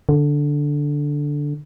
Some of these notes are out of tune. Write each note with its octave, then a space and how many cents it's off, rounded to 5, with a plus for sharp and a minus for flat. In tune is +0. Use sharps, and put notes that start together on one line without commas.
D3 -5